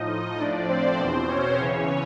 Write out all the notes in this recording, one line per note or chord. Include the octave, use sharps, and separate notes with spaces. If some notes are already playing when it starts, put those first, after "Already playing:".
Already playing: A2 F3 D#4 D#5
A2 F3 D4 D5
C4 C5
E2 B2 C4 C5
C#4 C#5
E2 C#3 E3 C#4 C#5